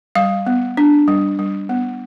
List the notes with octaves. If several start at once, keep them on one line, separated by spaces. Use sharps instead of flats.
G3 F5
B3
D4
G3
G3
B3